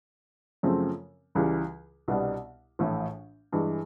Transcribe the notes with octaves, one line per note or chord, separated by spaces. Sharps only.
F#2 C#3 F3 A3 C4
C#2 C#3 E3 G3
C2 B2 G3 B3 D4
A#1 A2 E3 A3
G2 E3 G#3